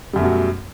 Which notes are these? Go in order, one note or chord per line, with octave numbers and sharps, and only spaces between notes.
F#2 B2 F#3 G3 A3